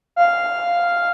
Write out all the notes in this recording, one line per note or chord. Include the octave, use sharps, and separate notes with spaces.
F5